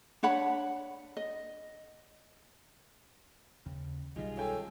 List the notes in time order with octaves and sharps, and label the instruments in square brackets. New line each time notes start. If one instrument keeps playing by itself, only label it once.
[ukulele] D4 C#5 F#5 B5
D#5
[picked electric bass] D#2 C#3
[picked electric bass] B1 D#3 G3 [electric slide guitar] G#3 F4 [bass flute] D#5
[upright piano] C#4 G5 G#5 [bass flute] A4